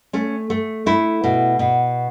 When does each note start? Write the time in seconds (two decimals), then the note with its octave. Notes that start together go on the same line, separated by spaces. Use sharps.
0.13 A3 C#4
0.50 A3
0.86 A3 E4
1.24 B2
1.59 B2